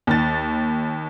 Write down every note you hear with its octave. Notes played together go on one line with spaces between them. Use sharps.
D#2 A6